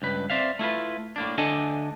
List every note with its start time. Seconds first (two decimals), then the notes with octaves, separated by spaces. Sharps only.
0.02 C#2 G2 B4
0.30 C4 D5 E5 F5
0.59 A3 E4 F4 B4
1.16 A2 A#3 D4
1.38 D2 D4 A4 D#5 F#5 G#5